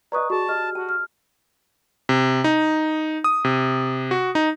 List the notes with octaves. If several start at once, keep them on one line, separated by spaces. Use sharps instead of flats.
B4 D5 D#5 A#5 C#6 D#6
F#4 G#4 A5 C#6
G4 D#5 F6
F#4 A5
F6
C3
D#4
D#6
C3
F#4
D#4